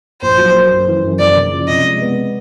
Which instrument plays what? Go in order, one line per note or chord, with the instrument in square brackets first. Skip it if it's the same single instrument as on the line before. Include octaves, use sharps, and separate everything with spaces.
[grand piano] A#1 [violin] C5
[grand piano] F#3
A#3
F#2
E3
F#2
[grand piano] F#1 [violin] D5
[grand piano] C#3
F3
[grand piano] C3 [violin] D#5
[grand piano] G#3
B3